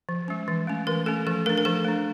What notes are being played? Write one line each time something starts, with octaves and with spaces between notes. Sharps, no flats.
F3
G#3 C#4
E3
A3 C#4
E3 A#4
A3 C#4 A4
F3 A4
A3 D4 A#4
A#4
F3 A4
A3 D4